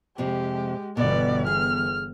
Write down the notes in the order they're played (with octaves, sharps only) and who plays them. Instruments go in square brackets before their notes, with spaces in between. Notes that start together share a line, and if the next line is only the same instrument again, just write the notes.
[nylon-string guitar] F2 C3 [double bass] G#3 [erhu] G4
[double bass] G1 E3 [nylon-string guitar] B2 [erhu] D5
[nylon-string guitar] G#4 [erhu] F6